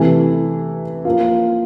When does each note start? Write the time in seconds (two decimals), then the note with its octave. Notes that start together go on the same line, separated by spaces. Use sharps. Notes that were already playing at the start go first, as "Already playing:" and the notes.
Already playing: C3 E3 A3 E4
1.05 F3 A#3 F4